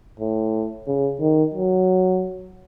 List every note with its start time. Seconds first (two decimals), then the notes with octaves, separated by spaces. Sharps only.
0.20 A2
0.87 C#3
1.20 D#3
1.54 F#3